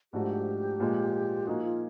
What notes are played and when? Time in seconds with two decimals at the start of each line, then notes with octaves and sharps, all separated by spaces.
0.13 G#2 F3 A3 D4 F#4 G4
0.80 A#2 F3 G#3
1.47 F3 A#3 D#4 F#4 G#4
1.64 F4